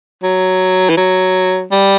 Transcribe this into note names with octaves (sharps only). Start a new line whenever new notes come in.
F#3
E3
F#3
G3